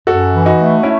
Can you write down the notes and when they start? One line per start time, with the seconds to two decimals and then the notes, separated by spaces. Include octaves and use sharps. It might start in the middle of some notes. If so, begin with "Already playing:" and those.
0.07 F#2 F#4 A4
0.33 E3
0.46 D#4 F#4
0.58 A3
0.83 A3 C#4 E4